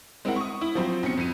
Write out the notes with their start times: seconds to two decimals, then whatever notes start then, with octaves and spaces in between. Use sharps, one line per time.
0.25 G#3 C4 E4 A#4 F#5
0.36 C#6 D#6
0.61 E4
0.75 F3 F#3 C4 C5
1.03 B1 C#3 C4 C#7
1.17 F2 D#7